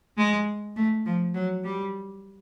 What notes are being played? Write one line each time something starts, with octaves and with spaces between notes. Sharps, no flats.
G#3
A3
F3
F#3
G3